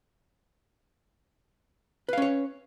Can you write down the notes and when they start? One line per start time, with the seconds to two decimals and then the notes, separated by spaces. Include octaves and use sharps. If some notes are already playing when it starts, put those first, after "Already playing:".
2.09 B4
2.13 F5
2.18 C#4
2.22 C#5